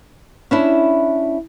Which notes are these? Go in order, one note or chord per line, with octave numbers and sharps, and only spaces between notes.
C#4 D4 E4